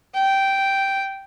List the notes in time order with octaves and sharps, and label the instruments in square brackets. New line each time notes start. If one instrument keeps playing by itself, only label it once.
[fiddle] G5